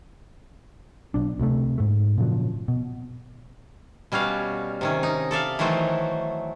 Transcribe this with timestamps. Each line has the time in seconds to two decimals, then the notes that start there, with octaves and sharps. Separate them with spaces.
1.14 B1 D4
1.40 D2 C3 A3
1.78 G#2 A3
2.18 A#2 C#3 F3 F#3
2.68 B2
4.12 B2 G3 C#4 F#4 F5
4.81 C3 D#3 C#4
5.03 D#4
5.31 A4 D5 E5 F5
5.59 D#3 E3 F#3 A3 C5